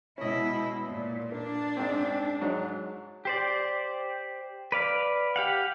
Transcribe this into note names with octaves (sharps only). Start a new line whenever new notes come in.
B2 G#3 C#4 E4 D#5
A#2
A#3 D4
G#2 C4
G#2 F#3
G4 C5 D5
B4 D5 F5
G4 F5 F#5